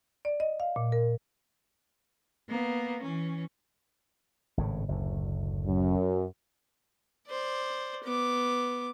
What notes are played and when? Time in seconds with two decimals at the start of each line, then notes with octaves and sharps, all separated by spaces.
0.25 D5
0.40 D#5
0.60 F5
0.76 A#2
0.92 A#4
2.49 A#3 B3
3.03 E3 C#4
4.57 G#1 A2 C#3
4.88 F#1 D2 A2
5.66 F#2
7.28 C5 D5
8.04 B3 D6